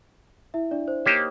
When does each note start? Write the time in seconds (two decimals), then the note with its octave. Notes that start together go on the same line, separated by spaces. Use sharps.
0.54 E4 E5
0.71 D4 D5
0.88 C5
1.06 A#3 D#4 G4 C5 C#5